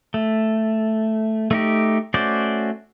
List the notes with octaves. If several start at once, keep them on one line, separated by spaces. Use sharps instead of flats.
A3
A3 D#4 G4
A3 C#4 F#4 C5 D5